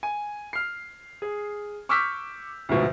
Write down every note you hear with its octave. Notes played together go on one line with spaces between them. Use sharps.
G#5
F6 C7
G#4
C#6 D6 E6 F6 G6 B6
D2 G#2 B2 F3